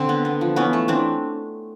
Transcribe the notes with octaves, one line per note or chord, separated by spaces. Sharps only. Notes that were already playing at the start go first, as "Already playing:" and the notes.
Already playing: D3 C4
B3
B3
F3
E3 B3 C#4
A3
E3 C4 D4